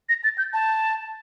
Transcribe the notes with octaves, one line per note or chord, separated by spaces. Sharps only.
A#6
A6
G6
A5